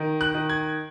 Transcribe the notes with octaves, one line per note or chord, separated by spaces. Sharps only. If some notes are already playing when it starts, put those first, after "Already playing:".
Already playing: D#3
F#6
D#3
G#6